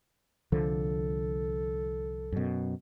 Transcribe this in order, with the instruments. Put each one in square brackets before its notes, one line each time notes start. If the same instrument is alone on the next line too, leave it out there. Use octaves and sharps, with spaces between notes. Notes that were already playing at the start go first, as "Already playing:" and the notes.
[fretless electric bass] C2 D3 F3 [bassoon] A4
[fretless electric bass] F#2 B2